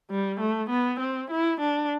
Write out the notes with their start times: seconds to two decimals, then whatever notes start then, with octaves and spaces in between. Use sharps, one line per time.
0.11 G3
0.40 A3
0.69 B3
1.00 C4
1.31 E4
1.60 D4